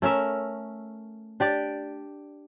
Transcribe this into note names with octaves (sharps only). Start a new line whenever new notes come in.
A3 C#4 A#4 E5
D4 G4 D5